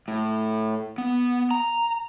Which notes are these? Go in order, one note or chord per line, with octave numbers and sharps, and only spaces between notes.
A2
B3
A#5